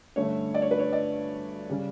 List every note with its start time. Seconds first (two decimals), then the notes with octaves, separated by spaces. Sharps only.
0.16 G2 D3 A3 C#4 C#5
0.54 D5
0.62 C#5
0.71 B4
0.79 C#5
0.93 D5
1.69 C#3 G3 C#4